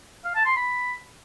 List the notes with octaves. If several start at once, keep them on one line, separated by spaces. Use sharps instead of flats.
F5
A5
C6
B5